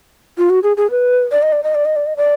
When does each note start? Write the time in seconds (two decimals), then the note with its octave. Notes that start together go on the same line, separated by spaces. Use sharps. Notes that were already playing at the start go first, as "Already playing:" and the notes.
0.38 F4
0.50 F#4
0.63 G#4
0.77 G#4
0.91 B4
1.32 D5
1.42 D#5
1.52 D5
1.64 D#5
1.75 D5
1.85 D#5
1.96 D5
2.06 D#5
2.17 D5